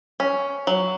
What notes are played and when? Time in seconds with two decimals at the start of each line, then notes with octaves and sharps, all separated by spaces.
0.20 C#4
0.67 F#3